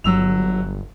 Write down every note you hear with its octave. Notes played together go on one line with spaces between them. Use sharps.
G1 F#3 E6 F7